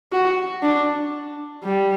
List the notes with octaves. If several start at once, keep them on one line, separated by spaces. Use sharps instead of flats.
F#4
D4
G3